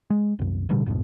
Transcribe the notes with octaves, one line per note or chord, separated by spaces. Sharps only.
G#3
C2 F#2
A1 B2 D3 G3
B1 F2 G#2 B2